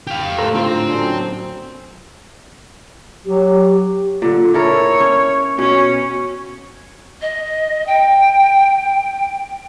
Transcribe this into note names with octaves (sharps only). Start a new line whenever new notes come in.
G4 F5
A2 A4 C5 A#5
D3 C4 F4 G4
F#3 C#4 D4
F#3 G4
A#2 D3
E4 A4 A#4 C#5
C#4
B2 C#4
D#5
G5